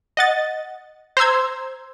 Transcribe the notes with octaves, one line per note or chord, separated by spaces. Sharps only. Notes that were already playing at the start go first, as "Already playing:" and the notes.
D#5 F#5 A6
C5 A#5 C6 E6 G#6